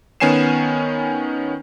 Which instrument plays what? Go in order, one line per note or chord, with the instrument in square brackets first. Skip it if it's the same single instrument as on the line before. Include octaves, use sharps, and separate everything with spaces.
[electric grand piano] D#3 B3 C#4 G#5 C7 E7